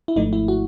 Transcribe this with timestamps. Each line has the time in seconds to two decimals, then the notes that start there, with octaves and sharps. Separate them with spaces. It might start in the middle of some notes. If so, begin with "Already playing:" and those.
0.08 E4
0.16 G#1 G#2 F3 A3 D#4
0.33 E4
0.48 F#4